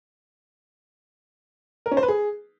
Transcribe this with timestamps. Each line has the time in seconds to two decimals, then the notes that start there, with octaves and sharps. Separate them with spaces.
1.86 A#4
1.91 C#4
1.97 C5
2.03 B4
2.08 G#4